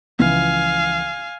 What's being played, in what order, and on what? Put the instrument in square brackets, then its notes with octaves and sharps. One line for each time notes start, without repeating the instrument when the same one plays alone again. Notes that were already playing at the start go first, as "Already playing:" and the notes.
[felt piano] C#2 E3 F3 [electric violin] F5 G#5